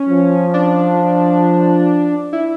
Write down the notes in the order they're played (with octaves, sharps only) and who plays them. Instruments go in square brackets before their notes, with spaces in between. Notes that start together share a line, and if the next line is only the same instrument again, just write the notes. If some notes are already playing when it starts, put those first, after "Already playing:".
Already playing: [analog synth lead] C#4
[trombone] F3
[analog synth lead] D4
E4